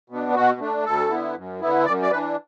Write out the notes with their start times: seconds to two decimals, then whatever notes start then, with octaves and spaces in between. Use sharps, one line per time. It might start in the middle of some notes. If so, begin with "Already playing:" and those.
0.10 B2 B3 D4
0.35 B2 F#4
0.60 A3 D4
0.85 D2 A4
1.10 D3 B3 E4
1.36 F#2
1.61 D3 B3 E4
1.85 F#2 D5
2.02 D5
2.11 E3 B4
2.15 D4